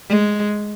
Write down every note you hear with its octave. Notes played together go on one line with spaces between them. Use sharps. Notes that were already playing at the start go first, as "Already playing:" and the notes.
G#3